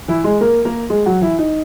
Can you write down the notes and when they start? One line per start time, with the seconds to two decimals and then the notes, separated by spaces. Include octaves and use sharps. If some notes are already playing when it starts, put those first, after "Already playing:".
0.08 E3 E4
0.24 G#3 G#4
0.41 A#3 A#4
0.65 A#3 A#4
0.90 G#3 G#4
1.06 F#3 F#4
1.21 E3 E4
1.39 D#4